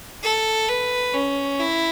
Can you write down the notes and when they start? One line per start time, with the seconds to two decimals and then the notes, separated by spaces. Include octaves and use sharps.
0.23 A4
0.69 B4
1.13 C#4
1.60 E4